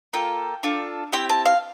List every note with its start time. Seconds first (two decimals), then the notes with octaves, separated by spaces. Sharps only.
0.13 A#3 F4 A4 G5
0.63 D4 F4 A4
1.12 C4 E4 G4 G5
1.29 A5
1.46 F5